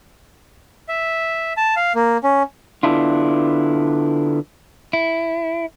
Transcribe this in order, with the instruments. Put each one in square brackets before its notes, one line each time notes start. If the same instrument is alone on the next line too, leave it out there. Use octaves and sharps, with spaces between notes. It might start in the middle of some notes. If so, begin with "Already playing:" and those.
[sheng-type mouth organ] E5
A5
F5
A#3
C#4
[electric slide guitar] D3 B3 D4 E4 F4
[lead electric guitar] E4